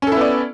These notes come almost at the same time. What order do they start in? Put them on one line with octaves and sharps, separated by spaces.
C#4 A4 E4 B3 D5